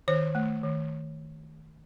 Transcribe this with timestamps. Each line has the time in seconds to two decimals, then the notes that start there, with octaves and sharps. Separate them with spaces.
0.08 D#3 C5
0.35 A3
0.63 D#3